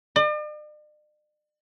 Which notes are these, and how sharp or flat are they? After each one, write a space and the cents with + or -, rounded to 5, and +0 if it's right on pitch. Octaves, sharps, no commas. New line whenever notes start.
D5 +45